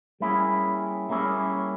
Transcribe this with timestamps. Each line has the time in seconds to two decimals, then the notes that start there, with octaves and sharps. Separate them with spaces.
0.20 G3 A#3 C#4 E4 G#4
1.09 G3 A#3 C#4 E4 G#4